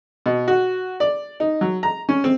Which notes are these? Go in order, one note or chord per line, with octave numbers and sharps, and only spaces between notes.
B2
F#4
D5
D#4
F#3
A#5
C#4
C4